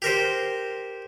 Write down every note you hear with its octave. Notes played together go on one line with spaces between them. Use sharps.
G4 A#4 C5